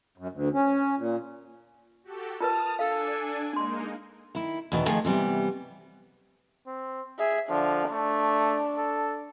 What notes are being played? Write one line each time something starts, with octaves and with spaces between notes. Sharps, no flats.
F#2
D2
C#4
A#2
F#4 G4 A4
F4 A#4 B4 A5 D#6 F6
D4 A4 F5 G#5
G#3 A#3 D4 D#4 C6
D#3 E4
E2 B2 D#3
D#3 F3 A3 G#4 D#5
C3 E3 G3 B3
C4
G#4 E5
D3 F3
A3 D4
A4